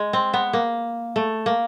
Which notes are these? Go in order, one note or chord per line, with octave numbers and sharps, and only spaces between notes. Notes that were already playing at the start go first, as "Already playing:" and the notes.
Already playing: G#3
C4
B3
A#3
A3
A#3